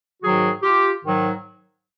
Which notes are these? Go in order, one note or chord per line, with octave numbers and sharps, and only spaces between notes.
G#2 D#3 F#3 F#4 G#4
F4 G4
G#2 D#3 F#3